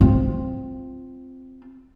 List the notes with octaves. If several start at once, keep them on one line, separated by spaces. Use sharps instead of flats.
C4 F4